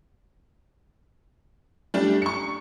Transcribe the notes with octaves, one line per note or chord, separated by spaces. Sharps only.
G3 A3 D4
C#6 C#7